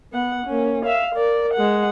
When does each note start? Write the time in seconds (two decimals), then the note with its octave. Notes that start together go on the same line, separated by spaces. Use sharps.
0.12 B3 F#5
0.46 A#3 C#4
0.85 E5 F5
1.15 A#4 D5
1.54 G#3 F#5